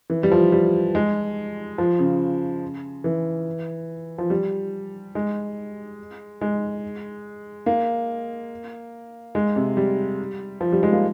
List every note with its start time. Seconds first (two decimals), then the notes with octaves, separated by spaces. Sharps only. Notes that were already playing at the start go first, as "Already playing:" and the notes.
0.10 E3
0.23 G3
0.32 F3
0.52 G3
0.95 G#3
1.78 F3
1.99 C#3
3.04 E3
4.18 F3
4.30 G3
5.15 G#3
6.41 G#3
7.66 A#3
9.35 G#3
9.56 C3
9.77 G3
10.61 F3
10.72 G3
10.83 G#3
10.93 A#3